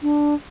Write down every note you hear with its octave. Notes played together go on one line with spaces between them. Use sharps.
D4